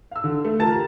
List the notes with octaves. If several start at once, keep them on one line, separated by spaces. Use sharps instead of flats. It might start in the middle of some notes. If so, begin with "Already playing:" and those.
F5 E6
D3
A3
E3 F4 A#4 A5 A6
G4 A#5